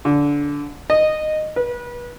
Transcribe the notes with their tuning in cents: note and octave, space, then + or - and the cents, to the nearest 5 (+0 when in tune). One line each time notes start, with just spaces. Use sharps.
D3 -15
D#5 -10
B4 -30